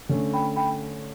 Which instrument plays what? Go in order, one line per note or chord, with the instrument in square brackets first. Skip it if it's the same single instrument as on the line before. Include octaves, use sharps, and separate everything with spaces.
[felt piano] D3 A3 C#4
[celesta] G5 B5
G5 B5